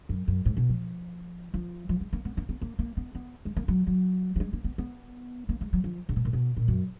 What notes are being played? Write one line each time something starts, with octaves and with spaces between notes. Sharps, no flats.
F#2
F#2
G#2
B2
F3
F3
F3
G#3
A#3
B3
A#3
B3
A#3
A#3
B3
B3
G#3
A#3
F#3
F#3
F#3
G#3
A#3
B3
B3
A#3
G#3
F#3
F3
C#3
B2
A#2
B2
A#2
F#2